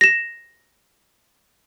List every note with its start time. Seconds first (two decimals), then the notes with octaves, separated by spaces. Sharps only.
0.01 A#6 E7